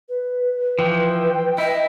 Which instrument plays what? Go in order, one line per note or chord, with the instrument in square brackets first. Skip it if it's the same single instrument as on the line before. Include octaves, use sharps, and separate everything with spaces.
[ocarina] B4
[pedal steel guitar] E3 F3 [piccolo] G5
[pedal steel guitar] E4 [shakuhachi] D#5